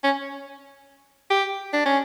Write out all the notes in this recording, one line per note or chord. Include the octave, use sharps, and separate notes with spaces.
C#4
G4
D4
C#4